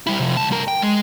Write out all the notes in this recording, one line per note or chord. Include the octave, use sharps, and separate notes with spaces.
G3 E4
C3 F3
C#2 A5
G2 A#4
G5
G#3